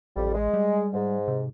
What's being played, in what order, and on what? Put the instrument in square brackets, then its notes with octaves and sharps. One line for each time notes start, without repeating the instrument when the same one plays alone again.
[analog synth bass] A1 [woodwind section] F2 G3
[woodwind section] G#3
[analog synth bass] G3
[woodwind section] G#2
[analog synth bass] C3